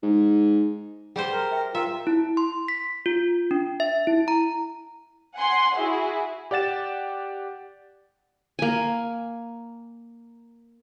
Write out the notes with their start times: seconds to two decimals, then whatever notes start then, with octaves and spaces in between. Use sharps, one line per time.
0.03 G#2
1.16 G3 G4 G#4 C5 F#5
1.33 A#4
1.52 E5 G5
1.75 F4 A#4 E5 G5 A#5
2.07 E4
2.37 C6
2.68 B6
3.06 F4
3.51 D4
3.80 E5
4.07 E4
4.28 A#5
5.38 F#5 G#5 C6
5.77 E4 F#4 G#4
6.51 G4 D5 F#5 A6 E7
8.59 A#3 G#5